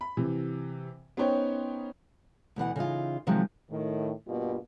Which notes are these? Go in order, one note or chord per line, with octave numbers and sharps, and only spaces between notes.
B5
C3 E3
B3 C#4 D#4 C5 C#5 G5
D2 B2 E3 F#5
C#3 E3 D#4 F4
C3 D#3 F3 F#3 G#3
A2 D#3
G2 B2 G3 A#3 F4